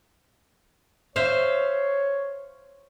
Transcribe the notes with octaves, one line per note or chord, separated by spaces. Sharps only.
C5 C#5 E5 F5